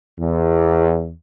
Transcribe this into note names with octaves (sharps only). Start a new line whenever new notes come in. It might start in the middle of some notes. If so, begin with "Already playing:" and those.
E2